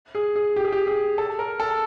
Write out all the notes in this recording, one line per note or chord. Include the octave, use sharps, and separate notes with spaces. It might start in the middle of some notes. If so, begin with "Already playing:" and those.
G#4
G#4
G4
G#4
G4
G#4
A4
A#4
A4